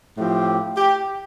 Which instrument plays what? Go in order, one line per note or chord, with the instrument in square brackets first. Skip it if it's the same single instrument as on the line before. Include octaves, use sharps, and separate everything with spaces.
[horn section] A2 F3 C4 G4
G4